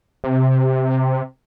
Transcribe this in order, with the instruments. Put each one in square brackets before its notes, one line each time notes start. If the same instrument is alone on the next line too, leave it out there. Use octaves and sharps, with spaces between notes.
[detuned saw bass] C3